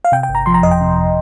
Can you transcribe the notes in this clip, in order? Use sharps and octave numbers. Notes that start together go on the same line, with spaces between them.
F5
C3 G5
G5
G1
A#5
F3 C6
A#5
F2 D#5
G5
C3